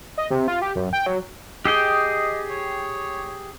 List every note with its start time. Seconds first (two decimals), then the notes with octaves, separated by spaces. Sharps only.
0.18 D#5
0.30 C3
0.48 F4
0.62 G4
0.76 F#2
0.93 G5
1.06 F#3
1.65 G4 G#4 D#5 G5
2.50 C#5